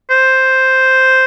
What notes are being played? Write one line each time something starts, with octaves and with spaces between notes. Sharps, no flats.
C5